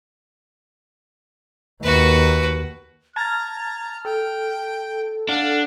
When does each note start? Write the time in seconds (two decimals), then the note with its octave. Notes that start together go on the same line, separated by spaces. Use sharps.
1.83 D#2 F#4 B4
3.16 A5 A#5 F6 G#6 A6
4.05 A4 G5
5.29 D4 F5 F#5